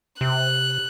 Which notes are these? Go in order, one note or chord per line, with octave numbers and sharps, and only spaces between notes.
C3 F#6